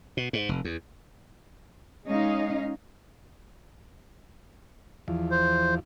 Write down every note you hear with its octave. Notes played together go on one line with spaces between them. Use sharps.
B2
G#2
F1
E2
G#3 C#4 D#4 D#5 F5
E2 F3
C5